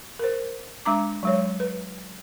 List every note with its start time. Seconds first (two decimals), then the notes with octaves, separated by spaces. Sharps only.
0.19 A#4 C5
0.85 G#3 D4 A#5 D6
1.23 F#3 G#3 C#5
1.60 B4